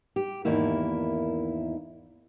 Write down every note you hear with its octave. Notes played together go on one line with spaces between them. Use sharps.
G4
E2 G#2 D#3 A#3 E4